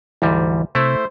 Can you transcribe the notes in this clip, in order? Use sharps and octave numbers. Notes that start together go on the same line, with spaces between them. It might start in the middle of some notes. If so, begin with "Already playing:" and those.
D2 G#2 E3 G3
C3 A3 E4 C5